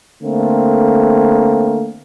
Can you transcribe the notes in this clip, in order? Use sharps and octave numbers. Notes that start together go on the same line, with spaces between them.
D3 A3 A#3 C4